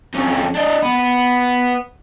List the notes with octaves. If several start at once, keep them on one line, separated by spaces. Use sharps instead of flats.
F2 C#4
D4 D#5
B3